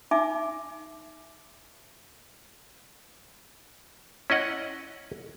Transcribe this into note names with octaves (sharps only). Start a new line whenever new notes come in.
D#4 E5 G#5 D6
C#4 E4 D#5 F#5